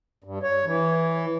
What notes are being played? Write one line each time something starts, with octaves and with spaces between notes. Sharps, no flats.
G2
C#5
E3